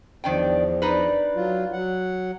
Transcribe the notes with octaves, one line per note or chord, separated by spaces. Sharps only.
E2 D#3 F3 D4 G5
D4 D#4 B4
F#3 F4
F#3 F#5